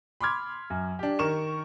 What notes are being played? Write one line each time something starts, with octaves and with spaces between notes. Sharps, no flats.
B5 C6 D6 F6 G#6
F#2
D4 G4
D#3 A#4 C#6 E7